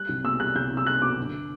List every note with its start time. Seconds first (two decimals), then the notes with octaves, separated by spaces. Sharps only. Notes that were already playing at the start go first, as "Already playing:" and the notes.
Already playing: G3 F#6
0.09 C2
0.24 B2 E6
0.40 G3 F#6
0.55 C2 G6
0.70 C2
0.77 E6
0.86 G3 F#6
1.02 B2 D6
1.17 G1